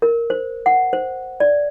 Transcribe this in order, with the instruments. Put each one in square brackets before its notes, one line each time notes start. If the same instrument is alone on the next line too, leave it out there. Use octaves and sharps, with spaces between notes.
[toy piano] A#4
C5
F#5
C5
D5